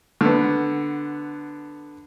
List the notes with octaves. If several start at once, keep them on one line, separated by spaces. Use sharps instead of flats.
D3 B3